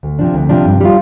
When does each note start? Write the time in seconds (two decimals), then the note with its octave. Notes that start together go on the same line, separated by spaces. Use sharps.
0.03 D2
0.19 C3 F3 D4
0.34 D2
0.49 C3 F3 D4
0.65 G2
0.81 G3 F4